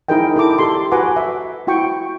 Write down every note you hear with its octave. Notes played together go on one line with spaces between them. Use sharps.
D#4 E4 G#4 A#4 D#5 G5
E4 A4 D6
G4 A4 C6
F#4 B4 F#5 G#5 A#5 D6
E5
E4 F#4 G5 C#6